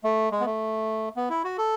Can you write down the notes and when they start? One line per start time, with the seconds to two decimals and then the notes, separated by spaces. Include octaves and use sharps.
0.04 A3
0.32 G#3
0.40 B3
0.46 A3
1.16 B3
1.30 E4
1.44 F#4
1.58 A4